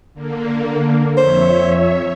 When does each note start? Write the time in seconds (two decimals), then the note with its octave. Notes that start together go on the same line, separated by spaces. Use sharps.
0.14 D3 A#3
1.17 F2 C5 C#5 E5